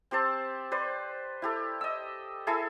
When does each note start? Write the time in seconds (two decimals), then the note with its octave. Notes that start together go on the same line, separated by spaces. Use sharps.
0.11 C4 G4 C5 A5
0.72 B4 C5 D5
1.42 E4 G4 A4
1.81 D#5 E6
2.47 E4 G#4 A4 E5